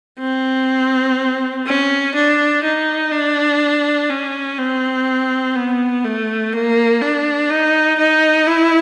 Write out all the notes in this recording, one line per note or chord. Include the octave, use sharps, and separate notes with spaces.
C4
C#4
D4
D#4
D4
C#4
C4
B3
A3
A#3
D4
D#4
D#4
E4